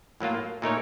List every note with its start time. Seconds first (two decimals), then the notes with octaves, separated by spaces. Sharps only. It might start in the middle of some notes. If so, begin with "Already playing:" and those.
0.20 A2 F#3 A#3 F4
0.62 A#2 A3 D#4 A#4 C#5